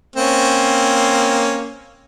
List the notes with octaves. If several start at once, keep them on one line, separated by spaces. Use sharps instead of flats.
A#3 C4 C#4